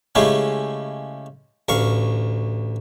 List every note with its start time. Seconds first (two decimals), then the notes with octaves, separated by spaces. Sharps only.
0.15 C#3 G#3 A3 C#4 E4 G4
1.69 A1 D2 F5 C#6